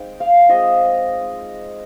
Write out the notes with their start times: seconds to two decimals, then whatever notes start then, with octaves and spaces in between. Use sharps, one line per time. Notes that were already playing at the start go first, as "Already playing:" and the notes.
Already playing: G#3 C4 D#4 G5
0.20 F5
0.49 G#3 C4 F4 D#5